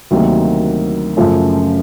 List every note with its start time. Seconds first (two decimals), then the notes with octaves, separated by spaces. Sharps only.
0.11 D2 C3 D#3 F#3 A#3
1.17 F#2 C#3 F3 A3